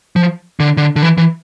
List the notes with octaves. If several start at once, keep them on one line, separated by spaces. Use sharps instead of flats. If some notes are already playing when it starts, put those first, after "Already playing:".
F3
D3
D3
D3
E3
E3